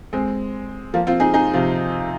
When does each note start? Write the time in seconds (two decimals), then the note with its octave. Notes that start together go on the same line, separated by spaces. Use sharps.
0.13 G#3 C4
0.94 F3 A#3
1.07 C4 F4
1.20 D#4 G#4
1.34 D#4 G#4
1.54 C3 F3